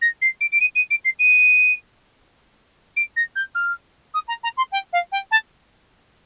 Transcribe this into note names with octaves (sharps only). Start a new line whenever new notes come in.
A#6
C7
D7
D7
D#7
D#7
D7
C7
D#7
D7
A#6
G6
F6
D#6
A#5
A#5
C6
G5
F5
G5
A5